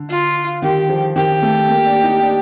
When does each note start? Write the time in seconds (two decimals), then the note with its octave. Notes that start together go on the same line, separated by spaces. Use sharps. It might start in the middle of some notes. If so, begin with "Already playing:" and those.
Already playing: D3
0.10 F4
0.62 D#3 G4
0.89 F3
1.16 D#3 G4
1.42 A3
1.69 A#3
1.86 D4
2.04 D#4
2.22 D4